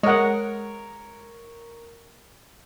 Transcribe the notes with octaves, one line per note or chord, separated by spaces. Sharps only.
G#3 A#4 C#5 D#5 F#5